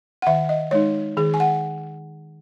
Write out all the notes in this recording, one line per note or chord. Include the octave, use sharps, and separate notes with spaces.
F#5
D#3 E5
D#5
G#3 D#4 C#5
D#3 G#4
G#5
F#5